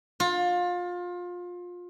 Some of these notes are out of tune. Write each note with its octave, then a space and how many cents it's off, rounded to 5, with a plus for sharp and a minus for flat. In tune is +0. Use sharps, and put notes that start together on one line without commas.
F4 +25